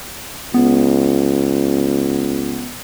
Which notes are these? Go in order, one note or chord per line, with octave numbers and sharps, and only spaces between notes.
C#2 B3